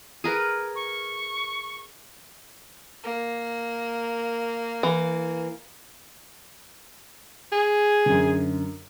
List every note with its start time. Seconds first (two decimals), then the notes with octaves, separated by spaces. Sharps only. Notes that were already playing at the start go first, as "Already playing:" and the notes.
0.24 G#4 A#4 B4
0.75 C#6
3.04 A#3
4.83 E3
7.52 G#4
8.06 F#2 D3